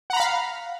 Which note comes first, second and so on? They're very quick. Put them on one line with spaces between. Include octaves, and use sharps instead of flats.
F#5 A#5 B5 F5